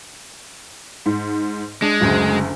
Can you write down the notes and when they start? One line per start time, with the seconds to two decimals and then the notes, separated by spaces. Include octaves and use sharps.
1.06 G#2
1.82 G#3 D4
2.01 F#1 D2 F#3